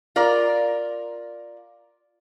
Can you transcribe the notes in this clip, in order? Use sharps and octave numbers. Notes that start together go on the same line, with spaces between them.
F4 A#4 D5